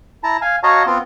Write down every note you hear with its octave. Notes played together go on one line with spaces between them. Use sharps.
E4 A5 A#5
F5 G#5
F#4 C#5 D#5 F5 A5 A#5
B3 C4 F4